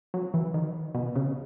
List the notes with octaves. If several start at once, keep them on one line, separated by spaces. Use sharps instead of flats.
F#3
E3
D#3
B2
C#3